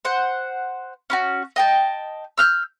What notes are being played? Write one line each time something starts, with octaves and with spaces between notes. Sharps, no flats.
C5 F#5
C#4 E4 F#4
D#5 G5 A5
E6 F6 G6